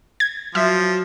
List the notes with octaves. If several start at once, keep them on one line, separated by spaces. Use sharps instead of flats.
G#6
F3 F#3 E5